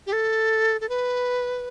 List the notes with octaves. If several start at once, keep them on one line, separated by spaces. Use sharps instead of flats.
G4
A4
A4
B4